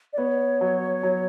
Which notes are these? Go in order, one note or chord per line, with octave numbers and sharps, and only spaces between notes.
D5
B3 C#5
F#3
F#3